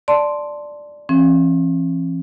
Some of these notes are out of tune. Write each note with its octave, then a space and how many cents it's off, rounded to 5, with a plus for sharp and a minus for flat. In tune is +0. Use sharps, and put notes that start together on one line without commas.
D5 +0 A5 +0 C6 +0
E3 +40 C4 +45